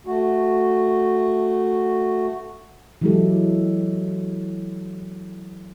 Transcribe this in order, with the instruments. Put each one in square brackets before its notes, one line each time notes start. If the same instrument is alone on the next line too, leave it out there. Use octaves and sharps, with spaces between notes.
[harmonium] A3 F#4
[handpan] E3 F#3 G#3 E4 G4 A4